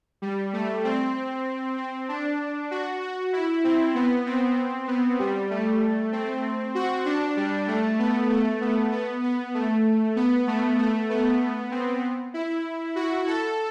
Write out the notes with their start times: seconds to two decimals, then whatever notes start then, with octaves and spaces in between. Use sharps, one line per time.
0.22 G3
0.53 A3
0.84 C4
1.77 C4
2.09 D4
2.71 F#4
3.02 F#4
3.33 E4
3.64 C4
3.95 B3
4.26 C4
4.88 B3
5.19 G3
5.50 A3
6.12 C4
6.75 F#4
7.05 D4
7.37 G3
7.67 A3
7.99 B3
8.30 A3
8.61 B3
8.92 B3
9.23 B3
9.54 A3
10.16 B3
10.47 A3
10.78 A3
11.10 B3
11.71 C4
12.34 E4
12.96 F#4
13.27 A4